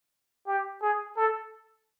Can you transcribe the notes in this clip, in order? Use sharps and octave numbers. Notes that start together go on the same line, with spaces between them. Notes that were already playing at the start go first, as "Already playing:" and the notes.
G4
G#4
A4